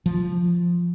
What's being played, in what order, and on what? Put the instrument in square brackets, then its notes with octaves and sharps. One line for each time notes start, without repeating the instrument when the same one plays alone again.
[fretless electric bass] F3